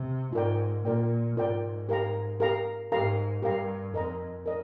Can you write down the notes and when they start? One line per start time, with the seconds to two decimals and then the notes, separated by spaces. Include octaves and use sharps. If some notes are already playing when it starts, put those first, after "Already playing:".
Already playing: C3
0.33 G#2 F4 A#4 D5 G5
0.85 A#2 F4 A#4 D5 G5
1.37 G#2 F4 A#4 D5 G5
1.89 G4 A#4 F5 A#5
2.40 G4 A#4 F5 A#5
2.92 G#2 G4 A#4 F5 A#5
3.43 G2 G4 A#4 F5 A#5
3.94 F2 A#4 D#5 A#5
4.46 A#4 D#5